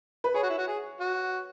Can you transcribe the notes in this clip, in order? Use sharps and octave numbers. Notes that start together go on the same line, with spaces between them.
B4
G#4 C#5
F#4
E4
F#4
G#4
F#4